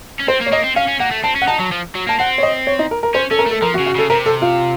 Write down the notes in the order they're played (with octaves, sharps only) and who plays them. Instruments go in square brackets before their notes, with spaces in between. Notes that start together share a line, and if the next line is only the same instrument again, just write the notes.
[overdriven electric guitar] C#4
[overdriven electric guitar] C4 [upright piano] C5
[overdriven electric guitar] A#3
[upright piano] C#5
[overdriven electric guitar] A#3 [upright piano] D#5
[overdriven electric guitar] C4
[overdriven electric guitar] C#4 [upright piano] F5
[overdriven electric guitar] C#4
[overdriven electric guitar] A#3 [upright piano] F#5
[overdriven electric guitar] A3
[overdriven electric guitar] C4 [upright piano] A5
[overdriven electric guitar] C#4
[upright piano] F#5
[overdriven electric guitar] D#4 [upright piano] A5
[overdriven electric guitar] F#3
F3
F#3
[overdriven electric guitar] A#3 [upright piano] A5
[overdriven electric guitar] C4 [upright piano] F#5
[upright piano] C#5
D#5
C#5
D#4
A#4
A#4
[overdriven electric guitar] C#4 [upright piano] C5
[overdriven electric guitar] C#4 [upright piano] A4
[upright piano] A#4
[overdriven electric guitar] A3 [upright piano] A4
[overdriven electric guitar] F3 [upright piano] A#4
[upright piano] F#4
[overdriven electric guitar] C#3
[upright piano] F#4
[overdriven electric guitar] C#3 [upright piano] A4
[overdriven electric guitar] C3 [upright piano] A#4
[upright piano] A4
F4